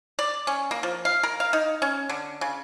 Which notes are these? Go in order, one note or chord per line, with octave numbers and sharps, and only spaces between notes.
D5
C#4
A#3
F3
F5
A#4
F5
D#4
C#4
D3
C#3